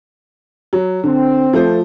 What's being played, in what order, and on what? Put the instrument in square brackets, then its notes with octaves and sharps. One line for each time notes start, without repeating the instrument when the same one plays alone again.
[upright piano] F#3
[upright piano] D3 [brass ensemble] C4
[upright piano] F3 A3 C5